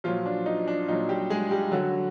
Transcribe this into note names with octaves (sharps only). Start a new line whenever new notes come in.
A#2 F3 F#3 F4
D4
D#4
D4
A#2 F#3 D#4
G3 G4
G#3 G#4
G3 G4
D3 F#3 F#4